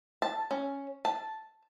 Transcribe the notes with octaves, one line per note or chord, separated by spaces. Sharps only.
A5
C#4
A5